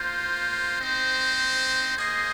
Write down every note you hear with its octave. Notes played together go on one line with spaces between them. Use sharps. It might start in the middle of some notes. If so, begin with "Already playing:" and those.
Already playing: A#3 F4 C5
C4 D#4 C5
A#3 G#4 C5 D#5